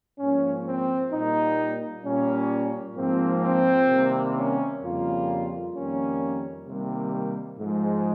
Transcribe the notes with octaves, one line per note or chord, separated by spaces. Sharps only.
G#2 F3 A#3 C#4
C4
A#2 G3 A#3 D#4
A#2 G3 A#3 C#4
G#2 F3 A#3 C4
C4
C3 D#3 G3 A#3
C#4
F2 C#3 G3 A#3 F4
F2 D#3 G3 A#3 C#4
C3 D#3 G3 A#3
G#2 F3 G#3